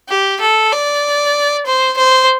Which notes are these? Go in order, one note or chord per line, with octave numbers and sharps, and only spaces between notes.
G4
A4
D5
C5
C5